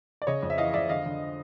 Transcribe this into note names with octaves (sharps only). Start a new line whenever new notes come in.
D5
C#3 C#5 D#5
F2
E5
E3 D#5 F5
F2 D5 E5
D3 D#5 F5
D3